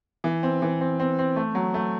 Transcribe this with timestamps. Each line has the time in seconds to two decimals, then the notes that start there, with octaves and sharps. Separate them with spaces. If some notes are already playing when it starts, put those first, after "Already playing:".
0.24 E3
0.43 C4
0.62 E3
0.81 C4
1.00 C4
1.19 C4
1.36 A3
1.55 F#3
1.74 A3